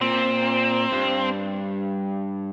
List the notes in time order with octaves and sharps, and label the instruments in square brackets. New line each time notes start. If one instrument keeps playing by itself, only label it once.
[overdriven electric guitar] A#2 [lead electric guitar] C4
[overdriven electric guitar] G2